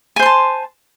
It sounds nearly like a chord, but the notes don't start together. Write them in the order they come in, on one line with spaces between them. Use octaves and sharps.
G#5 C5 C6 A5